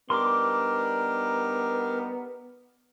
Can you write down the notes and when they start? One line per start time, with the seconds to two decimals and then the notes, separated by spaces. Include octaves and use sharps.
0.10 G3 B3 D4 D#4 A#4 C6 D6